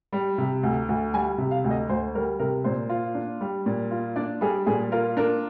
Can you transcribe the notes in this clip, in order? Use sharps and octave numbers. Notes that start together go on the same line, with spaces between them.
G3
C3
D2
D2
G3 G#5
C3
F5
D2
D#5
D2 C5
G3 A#4
C3 A#4
A#2 C5
F4
D4
G3
A#2
F4
D4 D5
G3 G#4
A#2 G#4
F4 A#4
D4 A#4